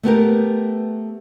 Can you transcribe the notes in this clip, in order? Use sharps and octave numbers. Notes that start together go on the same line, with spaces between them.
A3 B3 G4 A#4